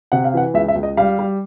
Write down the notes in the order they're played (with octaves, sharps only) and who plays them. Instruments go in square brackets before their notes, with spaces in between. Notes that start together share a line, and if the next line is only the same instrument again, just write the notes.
[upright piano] C3 F#5
F5
E3 F#5
C#2 E5
E5
C#2
D#5
G3 F5
G3